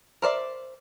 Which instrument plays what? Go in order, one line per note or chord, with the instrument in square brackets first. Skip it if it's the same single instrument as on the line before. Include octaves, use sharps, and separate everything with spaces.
[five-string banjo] A#4 C5 D5 E5